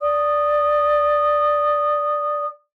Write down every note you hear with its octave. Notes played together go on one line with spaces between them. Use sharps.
D5 D#6